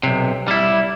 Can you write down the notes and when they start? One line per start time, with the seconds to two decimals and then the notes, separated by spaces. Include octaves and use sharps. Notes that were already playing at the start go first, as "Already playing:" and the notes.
0.03 B1 C3
0.48 G3 E4